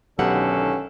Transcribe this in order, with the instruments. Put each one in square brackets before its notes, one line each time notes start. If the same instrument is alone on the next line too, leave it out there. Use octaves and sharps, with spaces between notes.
[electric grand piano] B1 [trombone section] D3 D#3 C#4 [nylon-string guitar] B3 G4 F#5 [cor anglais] A4